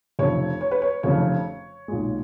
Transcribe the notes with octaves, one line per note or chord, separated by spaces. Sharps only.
F1 F2 C#3 C#5
C#5
B4
C#5
F1 F2 C#3 C#5
B1 A#2 G#3